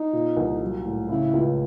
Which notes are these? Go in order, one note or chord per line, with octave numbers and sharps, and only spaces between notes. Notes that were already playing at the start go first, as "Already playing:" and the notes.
Already playing: D#4
A#2
C2
F#3
A2
C#3 E4
C#2